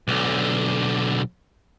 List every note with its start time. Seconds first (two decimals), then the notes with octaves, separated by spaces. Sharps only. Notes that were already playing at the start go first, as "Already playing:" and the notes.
0.08 B1 D3